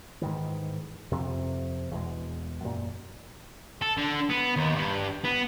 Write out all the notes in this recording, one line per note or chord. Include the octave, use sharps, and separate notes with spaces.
G#2 D#3 E3
F2 C3
E2 B2 G#3
F#2 A#2
A4
D3
B3
D#2
G2
B3